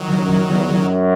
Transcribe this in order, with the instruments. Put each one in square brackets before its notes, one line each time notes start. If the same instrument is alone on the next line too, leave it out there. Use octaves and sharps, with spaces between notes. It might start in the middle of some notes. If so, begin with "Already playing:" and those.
Already playing: [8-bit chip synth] D#3 F#3
[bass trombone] F#2
E2
F#2